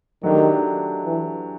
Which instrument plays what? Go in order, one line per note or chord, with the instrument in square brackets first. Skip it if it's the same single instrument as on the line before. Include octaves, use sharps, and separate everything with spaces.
[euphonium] D#3 [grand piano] F#3 A3 D4 G4
[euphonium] E3